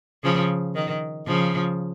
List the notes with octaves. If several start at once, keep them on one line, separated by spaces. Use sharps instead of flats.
C#3 F3
D#3
C#3 F3